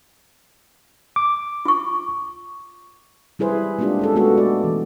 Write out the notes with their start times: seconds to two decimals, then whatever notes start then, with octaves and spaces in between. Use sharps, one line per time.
1.16 D6
1.65 F4 C#6
3.39 G3 E4 G#4 B4 C5
3.79 G#3 A#3 C4 D4 F4 G4
3.99 C#4 G#4 A4
4.15 G#3 A3 B3 F#4 A4
4.38 D5
4.64 E3